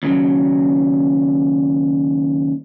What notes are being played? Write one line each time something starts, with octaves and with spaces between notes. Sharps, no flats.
D#2 C#3 F#3